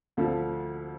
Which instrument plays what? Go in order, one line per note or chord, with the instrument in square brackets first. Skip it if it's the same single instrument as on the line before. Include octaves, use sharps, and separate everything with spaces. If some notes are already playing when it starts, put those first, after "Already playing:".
[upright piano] D2 D3 F3